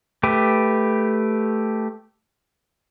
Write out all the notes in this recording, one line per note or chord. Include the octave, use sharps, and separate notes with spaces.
A3 G4 B4